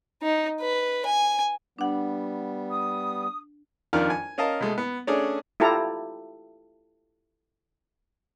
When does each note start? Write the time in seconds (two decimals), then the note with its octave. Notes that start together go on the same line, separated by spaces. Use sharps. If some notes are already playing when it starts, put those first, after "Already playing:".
0.23 D#4
0.60 B4
1.06 G#5
1.78 G3 B3 D4 F#5
2.70 D#6
3.93 F2 D#3 D4 F4 A#4 F6
4.10 G#5
4.38 C#4 A#4 D#5 F5 A5
4.60 B2 G#3 A3
4.78 B3
5.07 A3 C#4 D4 G#4 D5
5.60 E4 F4 G4 A4 A#5